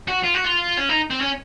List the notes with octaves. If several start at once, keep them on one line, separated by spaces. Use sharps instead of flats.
F#4
F4
F#4
F4
C#4
D#4
C4
C#4